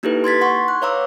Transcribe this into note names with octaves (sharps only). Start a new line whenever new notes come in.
A#3 D#4 E4 G4 A4 B4
C6 G#6 A6 B6
F#5 C6 C#6
F#6
B4 C#5 F5 A#5 D6 E6